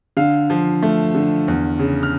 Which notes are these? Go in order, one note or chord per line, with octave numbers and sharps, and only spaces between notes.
D3 F5
F3
A3
D3
E2
C#3
F6